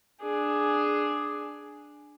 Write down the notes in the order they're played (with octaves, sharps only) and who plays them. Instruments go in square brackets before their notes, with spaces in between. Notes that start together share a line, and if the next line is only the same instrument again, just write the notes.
[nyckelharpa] D4 G#4